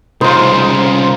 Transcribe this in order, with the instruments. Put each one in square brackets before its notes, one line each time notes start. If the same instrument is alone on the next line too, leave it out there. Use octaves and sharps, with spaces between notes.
[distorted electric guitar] C2 C#3 [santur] D#4 F4 [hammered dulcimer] C5